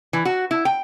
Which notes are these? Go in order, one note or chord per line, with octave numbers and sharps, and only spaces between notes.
E3
F#4
E4
G5